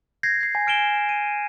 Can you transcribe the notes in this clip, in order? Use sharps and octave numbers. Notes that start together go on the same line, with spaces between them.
G6 G#6 A#6 C7
G6 C7
G#5
F6 D7 E7 G7
D#7